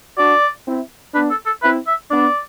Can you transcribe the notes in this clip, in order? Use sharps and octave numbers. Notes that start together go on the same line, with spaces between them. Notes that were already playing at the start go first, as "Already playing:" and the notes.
D4 F#4 D5
C4 E4
B3 D4 B4
A4
A4
C4 E4 B4
E5
B3 D4 D5